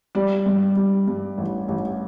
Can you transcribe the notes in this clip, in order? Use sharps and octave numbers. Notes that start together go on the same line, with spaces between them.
G3 D5
G2
G3
G2
A1
A1